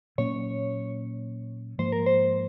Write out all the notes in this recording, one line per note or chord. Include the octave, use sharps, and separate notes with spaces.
A#2 F#3 A#3 C#4 C#5
G#2 F3 A#3 C5
A#4
C5